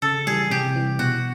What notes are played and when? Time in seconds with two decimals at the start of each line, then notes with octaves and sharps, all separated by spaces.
0.02 C#3 A4
0.27 E3 G3 G#4
0.50 C3 G4
0.76 E3 G3
0.99 B2 F#4